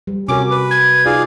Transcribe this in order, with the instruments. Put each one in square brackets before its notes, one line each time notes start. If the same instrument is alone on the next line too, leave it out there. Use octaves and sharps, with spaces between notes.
[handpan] G3
[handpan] C3 F#4 A#4 [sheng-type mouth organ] C#4 [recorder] D6
[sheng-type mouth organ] B4
[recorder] G#6
[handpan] D#4 F4 [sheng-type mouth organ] G#4 D5 F5